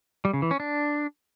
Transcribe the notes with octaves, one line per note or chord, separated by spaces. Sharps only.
G3
C#3
E3
C#4
D4